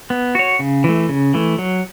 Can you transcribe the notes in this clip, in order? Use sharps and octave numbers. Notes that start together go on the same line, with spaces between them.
B3
F#4 C#5
C#3
E3 A3
C#3
E3 A3
F#3